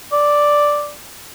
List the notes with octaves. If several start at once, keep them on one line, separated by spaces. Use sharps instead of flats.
D5